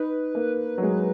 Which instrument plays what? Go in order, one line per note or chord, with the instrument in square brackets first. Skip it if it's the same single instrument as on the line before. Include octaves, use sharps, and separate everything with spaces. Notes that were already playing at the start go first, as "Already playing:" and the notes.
Already playing: [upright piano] D#4 [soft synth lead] B4
[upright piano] A#3
F#3
G#3